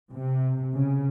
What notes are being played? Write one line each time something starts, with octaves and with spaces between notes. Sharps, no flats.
C3
C#3